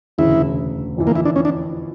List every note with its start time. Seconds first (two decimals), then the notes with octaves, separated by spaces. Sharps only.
0.18 E1 D2 C#3 E4
0.97 G1 F2 E3
1.07 A#3
1.16 E4
1.25 D4
1.36 C#4
1.45 D4